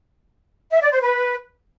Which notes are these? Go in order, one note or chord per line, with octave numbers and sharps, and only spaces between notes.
E5
D5
C5
B4